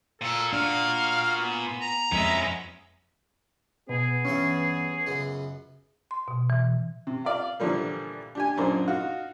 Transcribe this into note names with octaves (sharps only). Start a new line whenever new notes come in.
A#2 A4
A#2 D4 F#4 F5
B3 G#5
A#5
F2 G#3 B3 C#4 E5
B2 B3 G#4
G2 E3 C#4 E5
C#2 F#2 B3
C6
B2
E3
C3
F4 D5 F5
A#2 D3 E3 F3 G3 A#3
D4 G4 G#5
F#2 A#2 A#3 D4 D#4 C5
D#4 F4 F#4 F5